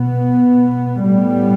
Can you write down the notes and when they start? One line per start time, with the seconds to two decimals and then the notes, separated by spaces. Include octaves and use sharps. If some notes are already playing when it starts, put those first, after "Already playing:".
Already playing: B2 B3
1.03 A2 G3 B3